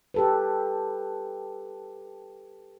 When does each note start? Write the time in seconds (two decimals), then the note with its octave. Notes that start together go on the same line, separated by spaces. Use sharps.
0.14 G4 A4 B4